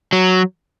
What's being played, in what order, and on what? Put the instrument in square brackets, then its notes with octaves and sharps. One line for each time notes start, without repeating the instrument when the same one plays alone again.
[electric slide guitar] F#3